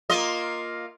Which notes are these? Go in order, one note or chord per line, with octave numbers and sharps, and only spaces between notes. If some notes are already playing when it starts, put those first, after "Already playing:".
A#3 F4 D#5